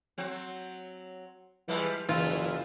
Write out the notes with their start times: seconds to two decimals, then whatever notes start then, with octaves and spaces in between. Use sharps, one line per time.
0.18 F#3 C4 F#4
1.68 E3 F3 G3 G#3
2.09 F#1 E3 D#4 F4